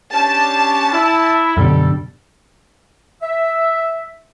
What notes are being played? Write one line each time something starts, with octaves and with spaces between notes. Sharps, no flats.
C#4 D4 G4 A5
E4
F#2 B2 D3 G3 A4
E5